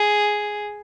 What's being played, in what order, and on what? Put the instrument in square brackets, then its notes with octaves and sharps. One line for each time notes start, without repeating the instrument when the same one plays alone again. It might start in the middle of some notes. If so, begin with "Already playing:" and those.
Already playing: [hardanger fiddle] G#4